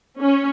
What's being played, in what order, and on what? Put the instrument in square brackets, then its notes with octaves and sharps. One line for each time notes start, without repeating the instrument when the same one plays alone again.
[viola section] C#4